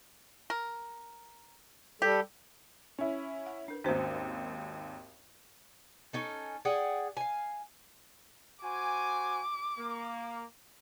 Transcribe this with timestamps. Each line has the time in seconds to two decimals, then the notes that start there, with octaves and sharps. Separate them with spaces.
0.50 A#4
2.02 G3 G4 A4
2.99 C#4 E4
3.46 F#5
3.68 D4 A#4 B4
3.84 G#1 D#2 C#4 F#4 C5
6.13 C#4 D#4 A4
6.65 G#4 D5 F#5 G5
7.17 F5 G#5
8.64 F#4 C5 G#5 D6
9.78 A#3